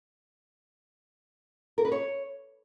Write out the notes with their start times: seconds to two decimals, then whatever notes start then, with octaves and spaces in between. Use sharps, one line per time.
1.78 A#4
1.85 B4
1.92 C#5